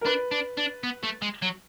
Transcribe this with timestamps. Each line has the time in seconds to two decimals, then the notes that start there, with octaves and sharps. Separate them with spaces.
0.01 A#4
0.05 D4 B4
0.31 D4
0.58 D4
0.83 B3
1.03 A3
1.22 G#3
1.42 F#3